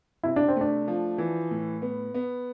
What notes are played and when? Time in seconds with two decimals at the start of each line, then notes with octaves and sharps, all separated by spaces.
0.23 C3 E4
0.36 D4
0.48 C4
0.56 A3 D4
0.88 F3
1.18 E3
1.51 A2
1.82 B3
2.14 B3